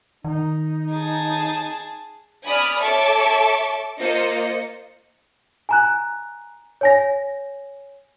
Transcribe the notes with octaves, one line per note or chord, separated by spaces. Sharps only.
D#3 D#4
G#4 A5
D5 G#5 B5 D#6 F6
A4 C#5 E5 A5 C#6 D6
A#3 F4 C5 D#5 C#7
G#5 A#5 F#6
C#5 G#5 A#6